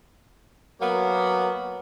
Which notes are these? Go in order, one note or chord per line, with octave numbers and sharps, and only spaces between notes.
F#3 A#3 B3